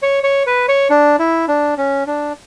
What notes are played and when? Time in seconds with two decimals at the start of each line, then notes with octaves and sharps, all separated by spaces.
0.02 C#5
0.24 C#5
0.47 B4
0.68 C#5
0.90 D4
1.19 E4
1.48 D4
1.78 C#4
2.07 D4